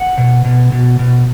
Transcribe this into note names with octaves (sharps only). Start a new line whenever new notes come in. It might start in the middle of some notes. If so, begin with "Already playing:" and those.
Already playing: F#5
B2
B2
B2
B2